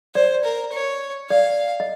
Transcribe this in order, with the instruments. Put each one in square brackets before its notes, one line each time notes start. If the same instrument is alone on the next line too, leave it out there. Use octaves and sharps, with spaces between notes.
[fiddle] C5 [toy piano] D5
[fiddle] A#4
C#5
[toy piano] D5 [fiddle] F5
[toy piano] D#5